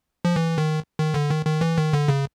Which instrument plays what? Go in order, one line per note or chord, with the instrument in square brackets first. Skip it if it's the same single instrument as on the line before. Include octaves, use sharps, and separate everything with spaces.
[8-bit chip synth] F3
E3
D#3
D#3
D3
D#3
D#3
E3
D#3
D3
C#3